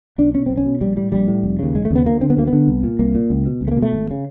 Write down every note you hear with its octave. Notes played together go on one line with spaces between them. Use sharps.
B1 D4
B2 C#4
B1 C4
C#4
B2
A#1 G3
A2 G3
A#1 G3
A2
F1
D#2 C#3
F1 G#3
A3
D#2 C#3 B3
D2 A#3
D3 C4
B3
D2 A#3
B3
D3
C2
A#2
C2 A#3
A#2
C#2
B2
C#2
A3
A#3
B2
A3
G#1
C#3